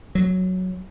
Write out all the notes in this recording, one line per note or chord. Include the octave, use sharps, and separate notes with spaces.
F#3